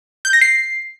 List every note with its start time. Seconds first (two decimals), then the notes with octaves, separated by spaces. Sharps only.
0.25 G6
0.33 A#6
0.41 C7